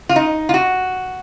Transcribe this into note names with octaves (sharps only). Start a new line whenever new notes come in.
F4
D#4
F4
F#4